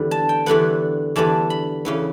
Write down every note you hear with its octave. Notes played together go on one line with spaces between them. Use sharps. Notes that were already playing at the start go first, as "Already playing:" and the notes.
Already playing: E2 D3 G3 B3
A5
G5
E2 D3 G3 B3 F#5
E2 D3 G3 B3 A5
B5
C#3 E3 B3